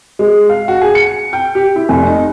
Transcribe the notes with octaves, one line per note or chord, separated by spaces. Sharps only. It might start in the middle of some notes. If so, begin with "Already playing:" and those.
G#3
F5
F#4
G#4
C#7
G5
G4
E4
F1
D#4